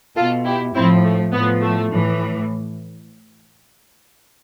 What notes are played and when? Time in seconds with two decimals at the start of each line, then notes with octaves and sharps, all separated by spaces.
0.16 B2 F4 A4
0.45 E4 G4
0.74 A2 F3 C4 E4
1.04 A3
1.33 A2 F3 B3
1.62 A3
1.91 A2 E3